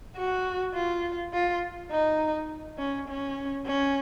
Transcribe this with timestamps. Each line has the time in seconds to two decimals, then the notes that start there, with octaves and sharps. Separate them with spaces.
0.17 F#4
0.75 F4
1.34 F4
1.91 D#4
2.78 C#4
3.08 C#4
3.66 C#4